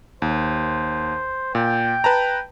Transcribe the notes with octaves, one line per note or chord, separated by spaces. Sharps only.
D#2 C5
A#2 G5
B4 A5 A#5